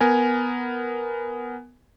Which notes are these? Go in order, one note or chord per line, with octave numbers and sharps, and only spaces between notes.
B3 A#4 G#5